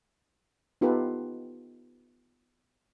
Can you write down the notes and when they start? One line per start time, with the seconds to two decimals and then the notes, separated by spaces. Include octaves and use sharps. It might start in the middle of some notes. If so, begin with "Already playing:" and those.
0.81 B3 D#4 F4 G4 A4 B4